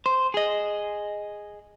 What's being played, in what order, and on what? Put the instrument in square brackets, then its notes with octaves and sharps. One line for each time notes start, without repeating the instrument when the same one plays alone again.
[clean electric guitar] C5
G#4 D#5